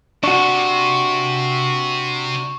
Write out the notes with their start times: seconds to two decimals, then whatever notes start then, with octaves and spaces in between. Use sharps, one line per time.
0.24 C3 D4 F#4 C#6